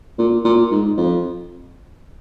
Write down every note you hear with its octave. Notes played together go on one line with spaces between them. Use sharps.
A#2
A#2
G#2
F2